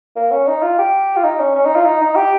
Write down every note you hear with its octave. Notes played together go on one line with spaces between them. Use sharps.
A#3
C#4
D#4
F4
G4
F4
D#4
C#4
C#4
D#4
F4
D#4
D#4
G4